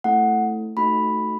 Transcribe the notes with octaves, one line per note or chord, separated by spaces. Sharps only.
A3 C4 E4 A4 F#5
A3 D#4 F#4 A4 B5